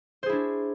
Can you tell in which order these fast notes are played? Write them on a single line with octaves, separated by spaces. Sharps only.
C5 G#4 E4 D4